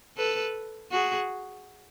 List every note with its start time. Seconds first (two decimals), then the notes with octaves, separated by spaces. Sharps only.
0.17 A4 B4
0.92 F#4 G#4